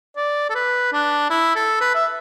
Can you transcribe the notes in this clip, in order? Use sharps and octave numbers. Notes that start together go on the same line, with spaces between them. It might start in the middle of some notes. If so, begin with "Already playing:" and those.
D5
A4
B4
D4
E4
A4
B4
E5